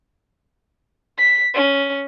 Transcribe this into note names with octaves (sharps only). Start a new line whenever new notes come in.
B6
C#4